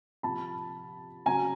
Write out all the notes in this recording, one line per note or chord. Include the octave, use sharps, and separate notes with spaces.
C3 F3 A5 B5
C#3 F#3 G#5 A#5